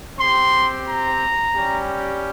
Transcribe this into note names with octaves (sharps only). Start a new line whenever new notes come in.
C4 G4 C6
A#5
G3 C#4 G4